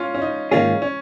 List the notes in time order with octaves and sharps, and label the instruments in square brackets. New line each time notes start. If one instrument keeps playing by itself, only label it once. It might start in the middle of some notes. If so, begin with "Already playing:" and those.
Already playing: [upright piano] C#4 F4
C#4
D#4
[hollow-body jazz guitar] G#2 D#3 A#3 F4 G#4 [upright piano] C#4
[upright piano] C#4